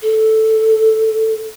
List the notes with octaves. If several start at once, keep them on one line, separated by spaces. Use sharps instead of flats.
A4